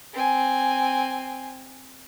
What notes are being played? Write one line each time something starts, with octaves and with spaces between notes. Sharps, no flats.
C4 G#5